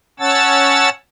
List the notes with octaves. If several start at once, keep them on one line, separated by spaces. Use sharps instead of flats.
C#4 C#5 F#5 A5 E6 A6